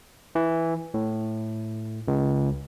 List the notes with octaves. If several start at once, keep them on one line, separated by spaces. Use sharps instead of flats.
E3
A2
C#2